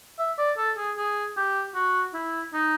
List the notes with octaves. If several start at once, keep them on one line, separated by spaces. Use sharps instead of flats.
E5
D5
A4
G#4
G#4
G4
F#4
E4
D#4